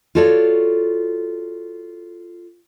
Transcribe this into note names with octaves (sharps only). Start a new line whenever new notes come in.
F4 F#4 A4 C#5 D5